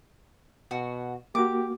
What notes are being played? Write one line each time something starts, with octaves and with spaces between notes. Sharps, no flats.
B2 F#4
A#3 F#4 G4 D6